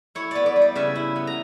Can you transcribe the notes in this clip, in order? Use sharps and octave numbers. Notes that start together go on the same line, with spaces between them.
E4 C#5
B3 D5
D5
G3
D5
C#3 E5
E4
B3
A#5